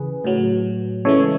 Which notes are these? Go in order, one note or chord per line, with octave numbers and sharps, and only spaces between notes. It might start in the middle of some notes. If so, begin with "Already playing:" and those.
Already playing: C#3 E3 G#4 B4
A2 F#3
C#3 E3 G#3 A4 C#5